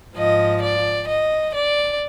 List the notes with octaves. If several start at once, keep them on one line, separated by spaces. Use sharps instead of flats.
G#2 F3 D#5
D5
D#5
D5